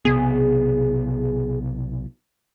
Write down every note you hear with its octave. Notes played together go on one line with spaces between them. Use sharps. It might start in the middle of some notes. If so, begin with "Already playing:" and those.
B1 C3 B3 G#4